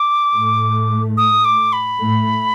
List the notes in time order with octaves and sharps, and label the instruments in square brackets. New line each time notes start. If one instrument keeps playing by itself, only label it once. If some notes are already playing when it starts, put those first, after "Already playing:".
Already playing: [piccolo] D6
[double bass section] A2 A3
[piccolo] D#6
D6
B5
[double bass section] A2 A3